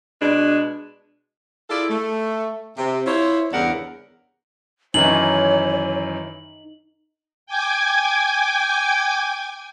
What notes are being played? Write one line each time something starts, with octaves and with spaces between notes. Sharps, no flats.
B2 G#3 D4
E4 F4 G#4 A4 D5 E5
A3
C3
E4 F4 C5 C#5
E2 G2 C#3 D4 A#4 F#5
F#2 D#3 E3 D#4 C#5 F#7
G5 G#5 D6 G#6